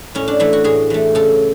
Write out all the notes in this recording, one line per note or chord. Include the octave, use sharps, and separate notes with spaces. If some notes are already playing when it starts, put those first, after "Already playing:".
A2 C#4
D4
E3 A3 E4
F#4
A2 G#4
E3 A3
C#3 A4